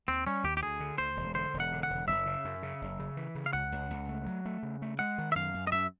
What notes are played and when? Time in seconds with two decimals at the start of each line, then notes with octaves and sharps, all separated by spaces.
0.08 D#2 C4
0.26 G3 C#4
0.44 D#2 G4
0.57 G4
0.62 D2 G#4
0.80 D3
0.98 D2 C5
1.16 E1
1.35 D3 C5
1.54 E1
1.60 F#5
1.72 D3
1.83 F#5
1.90 E1
2.08 F#1 E5
2.26 C#3
2.45 F#2
2.63 C#3
2.81 F#1
2.99 C#3
3.17 E3
3.35 C#3
3.46 F5
3.53 C#2 F#5
3.72 C#2
3.90 C#2
4.09 A3
4.26 F#3
4.45 A3
4.63 C#3
4.82 A3
4.99 G#3 F#5
5.18 D#3
5.32 E5
5.35 F#2 F5
5.54 F#2
5.67 D#5
5.72 F#2 E5